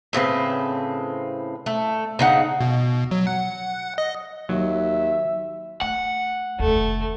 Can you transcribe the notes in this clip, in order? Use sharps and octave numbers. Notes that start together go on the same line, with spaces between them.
A2 C#3 C4 B4
A3
C#3 D#4 F#5
B2
F#3
F#5
D#5
D#2 F#3 E5
A3 F#5
F1 D#2 A3